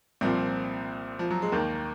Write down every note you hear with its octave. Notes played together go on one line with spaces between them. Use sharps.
C2 A#2 F3 C4
F3
F#3
G#3
D#2 D#3 A#3